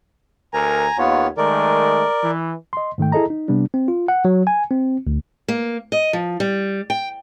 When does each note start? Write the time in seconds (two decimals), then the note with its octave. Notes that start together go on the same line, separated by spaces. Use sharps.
0.54 D2 A#4 G#5 A#5
0.98 D#2 B3 F4 C#5
1.37 D#3 G#3 A3 A#4 D5
2.23 E3
2.73 D#5 C6
2.98 G#2 D#3 A3 G5
3.12 E4 G#4 A4 D#5 A#5
3.30 D#4
3.48 C3 G3 B3 D4
3.74 C4
3.88 F4
4.08 F#5
4.25 F#3
4.47 G#5
4.71 C4
5.07 D2
5.48 A#3
5.92 D#5
6.13 F3
6.40 G3
6.90 G5